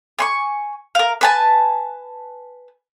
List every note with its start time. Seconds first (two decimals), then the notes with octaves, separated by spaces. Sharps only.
0.19 G#5 C6 C#6
0.95 A#4 F5
1.21 B4 G#5 A5